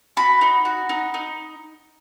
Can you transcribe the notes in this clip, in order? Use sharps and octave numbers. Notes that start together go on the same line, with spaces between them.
F#4 B5
D#4
F#4
D#4
D#4